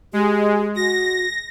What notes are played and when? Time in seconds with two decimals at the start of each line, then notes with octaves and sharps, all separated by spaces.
0.13 G#3 G4
0.76 F#4 A#6